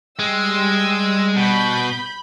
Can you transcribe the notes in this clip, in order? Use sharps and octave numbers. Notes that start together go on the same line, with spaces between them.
G3 G#3 G5 E6
B2 B5 G6